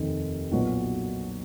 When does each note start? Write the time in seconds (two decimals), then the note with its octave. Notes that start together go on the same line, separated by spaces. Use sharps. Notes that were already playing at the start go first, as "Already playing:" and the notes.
Already playing: F1 D#2 D#3
0.51 B1 A#2 F#3 B3 F#4